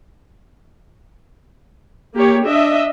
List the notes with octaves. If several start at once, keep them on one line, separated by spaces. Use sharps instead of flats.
A#3 G4 C#5
D4 D#5 E5